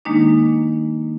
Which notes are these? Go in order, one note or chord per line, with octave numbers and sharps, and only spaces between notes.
D#3 G#3 A#3 D4 D#4